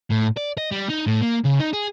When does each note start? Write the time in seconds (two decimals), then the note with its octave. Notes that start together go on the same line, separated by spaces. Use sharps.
0.10 A2
0.37 D5
0.58 D#5
0.71 G3
0.89 D#4
1.07 A2
1.21 A#3
1.44 C#3
1.59 D#4
1.73 G#4